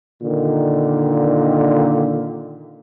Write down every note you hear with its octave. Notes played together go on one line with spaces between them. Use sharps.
A#2 D3 D#3